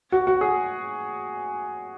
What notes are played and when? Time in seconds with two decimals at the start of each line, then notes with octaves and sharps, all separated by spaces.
0.12 F#4
0.27 F#4
0.41 G#4